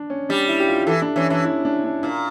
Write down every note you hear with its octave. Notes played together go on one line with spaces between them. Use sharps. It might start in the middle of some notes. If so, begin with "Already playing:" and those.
Already playing: D4
C#4
G3 D4
E4
G4
F4
E3 A4
D4
E3 C#4
E3 D4
E4
D4
D4
A#2 D4